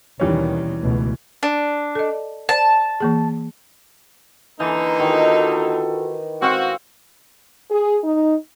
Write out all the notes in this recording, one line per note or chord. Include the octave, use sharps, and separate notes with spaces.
D#2 B2 D#3 E3 G3 C#4
C#2 B2 A3
D4
A4 D#5
C5 D5 A5
E3 A#3 G#4
D3 E3 A#3 D#4
D#3 F4 F#4 A4
C4 F#4 F5
G#4
D#4